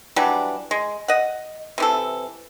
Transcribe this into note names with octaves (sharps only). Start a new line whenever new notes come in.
E3 F#3 G3 D4
G#3
D#5 F#5
C3 E3 A4